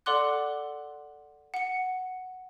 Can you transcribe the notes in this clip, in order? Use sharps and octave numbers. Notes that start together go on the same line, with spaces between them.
A4 D5 F#5 C6 D6 F#6
F#5 C#7